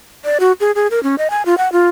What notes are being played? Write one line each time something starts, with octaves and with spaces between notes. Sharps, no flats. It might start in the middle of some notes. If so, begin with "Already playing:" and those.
D5
F#4
G#4
G#4
A#4
C#4
D#5
G#5
F4
F#5
F4